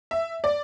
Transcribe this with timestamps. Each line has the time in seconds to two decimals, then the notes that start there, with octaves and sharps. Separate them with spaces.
0.11 E5
0.44 D5